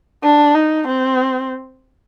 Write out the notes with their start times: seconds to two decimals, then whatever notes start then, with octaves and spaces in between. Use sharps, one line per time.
0.23 D4
0.55 D#4
0.87 C4